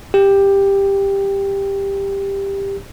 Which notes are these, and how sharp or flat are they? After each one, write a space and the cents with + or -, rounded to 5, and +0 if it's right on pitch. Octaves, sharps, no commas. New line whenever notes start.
G4 +10